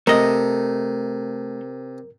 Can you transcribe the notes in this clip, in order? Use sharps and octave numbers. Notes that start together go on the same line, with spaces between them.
C3 A3 A#4 D#5